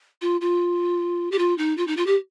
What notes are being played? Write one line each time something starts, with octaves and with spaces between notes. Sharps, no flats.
F4
F4
G4
F4
D#4
F4
D#4
F4
G4